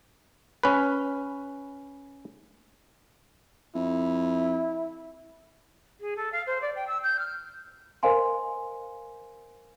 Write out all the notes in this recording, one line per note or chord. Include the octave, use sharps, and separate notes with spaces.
C#4 B4
F2 E4
G#4
A4
F5
C5
D5
G5
E6
G6
F6
A#4 C5 D#5 F5 G#5 C6